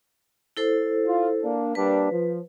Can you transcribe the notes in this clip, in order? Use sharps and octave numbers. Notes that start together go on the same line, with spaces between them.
E4 A4 C5
F4
A#3 D4
G3 A#3 D4 B4
F3